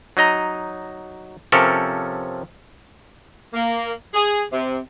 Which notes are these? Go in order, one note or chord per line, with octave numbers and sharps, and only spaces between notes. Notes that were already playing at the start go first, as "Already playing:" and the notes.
F#3 D#4 D#5 A#5
C3 F3 C#4 A4 A#4 C#5
A#3
G#4
C3